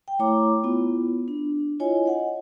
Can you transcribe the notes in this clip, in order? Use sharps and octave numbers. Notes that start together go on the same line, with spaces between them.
G5
A3 E4 C#5 A#5 D6
B3 E4 F4
D4
E4 F4 C#5 D#5 G#5
D#5 F#5 G#5